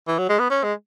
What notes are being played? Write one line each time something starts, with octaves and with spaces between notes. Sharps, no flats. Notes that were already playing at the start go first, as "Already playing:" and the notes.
E3
F#3
G#3
B3
C#4
G#3